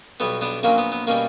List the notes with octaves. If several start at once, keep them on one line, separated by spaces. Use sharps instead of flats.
B1 B2 G3 B3
B3 D4
A#1 A#2 F#3 A#3 C#4
B3
B3
B2 G3 A#3 C#4